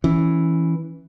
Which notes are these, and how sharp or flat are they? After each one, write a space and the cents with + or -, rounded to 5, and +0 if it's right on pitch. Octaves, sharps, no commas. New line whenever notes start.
E3 -5 C#4 +0